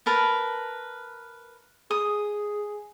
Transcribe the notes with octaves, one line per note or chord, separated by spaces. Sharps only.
A#4 B4 A5
G#4 D#6